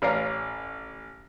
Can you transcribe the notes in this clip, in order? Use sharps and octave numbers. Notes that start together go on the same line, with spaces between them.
A1 C#5 D5 F5 A#5